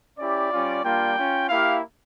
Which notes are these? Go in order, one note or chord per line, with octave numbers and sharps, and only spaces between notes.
C#4 E4 G4 D5
G3 C#4 F4
G3 A#3 D4 F4 G5
C#4 F4
A#3 E4 G4 F5